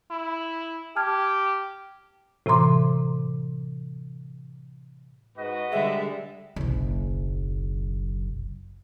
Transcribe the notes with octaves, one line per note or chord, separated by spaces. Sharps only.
E4
G4 A5 F6 G#6
A2 C3 E3 A#5 C6 D6
G#2 F#4 B4 D#5
D3 G3 G#3 G#4 E5
F#1 B1